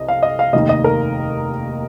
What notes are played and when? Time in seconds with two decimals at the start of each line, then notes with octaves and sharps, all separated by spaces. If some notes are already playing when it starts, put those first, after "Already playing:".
Already playing: C2 C3 D#5
0.08 F5
0.23 D#5
0.39 F5
0.53 F1 D#2 D#3 D#5
0.69 D#5
0.84 A#4